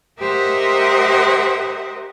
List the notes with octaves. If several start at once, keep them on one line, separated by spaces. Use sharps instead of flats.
G4 A#4 C5 D#5 E5 F#5